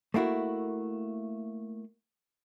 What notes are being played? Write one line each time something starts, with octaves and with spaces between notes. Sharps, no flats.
A3 A#3 E4 F#4